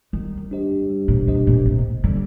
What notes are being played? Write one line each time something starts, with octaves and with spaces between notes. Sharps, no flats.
D#3 G3
D4 G4 C5 D#5
G3
A#2
C3 D4 G4 C5 D#5
A#2
A2 C3
D3 G3 A#3